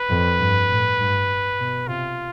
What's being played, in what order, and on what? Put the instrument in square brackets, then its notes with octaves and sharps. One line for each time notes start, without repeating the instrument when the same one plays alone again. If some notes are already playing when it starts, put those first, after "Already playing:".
Already playing: [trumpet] B4
[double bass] F2
G2
A2
G2
B2
[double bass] C3 [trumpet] F4